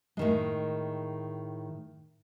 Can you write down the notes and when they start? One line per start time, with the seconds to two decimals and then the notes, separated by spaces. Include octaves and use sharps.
0.17 A2 D#3 G#3